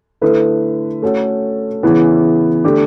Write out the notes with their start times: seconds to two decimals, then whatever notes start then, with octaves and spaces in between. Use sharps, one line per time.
0.21 D3 A3 E4 B4
1.02 A3 C#4 F#4 A4
1.83 C#3 E3 B3 E4
2.64 D3 A3 D4 G4